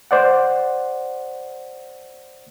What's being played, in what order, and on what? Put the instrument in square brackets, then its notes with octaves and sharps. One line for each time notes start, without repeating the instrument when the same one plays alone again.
[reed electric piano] C5 D5 F#5